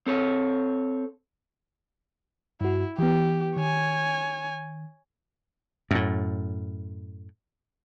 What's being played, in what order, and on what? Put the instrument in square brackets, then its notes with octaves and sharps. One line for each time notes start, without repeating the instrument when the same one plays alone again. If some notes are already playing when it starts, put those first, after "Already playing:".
[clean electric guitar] C4 A4 C#5
[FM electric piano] G2 F#4 [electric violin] E4
[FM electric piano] E3 B3 [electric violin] G4
[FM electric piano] D#3 [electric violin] C#5 G#5
[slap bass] F#2 A2